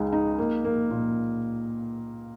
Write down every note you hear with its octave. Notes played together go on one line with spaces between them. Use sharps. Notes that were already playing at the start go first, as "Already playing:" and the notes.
Already playing: C#2 G#3 D#4
D#4
A#3
A#3
A#2